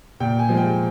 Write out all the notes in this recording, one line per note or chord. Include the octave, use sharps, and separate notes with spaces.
A#2 G5
G#5
F3 G#3
G5